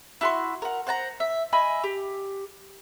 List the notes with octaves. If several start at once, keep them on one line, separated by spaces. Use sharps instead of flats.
E4 F#4 A5 C6
A#4 F#5
C5 F#5 A5 A#5
E5
D#5 E5 G#5 B5
G4